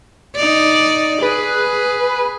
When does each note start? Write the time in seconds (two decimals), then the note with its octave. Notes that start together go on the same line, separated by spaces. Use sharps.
0.36 D#4 D5
1.22 G#4 B4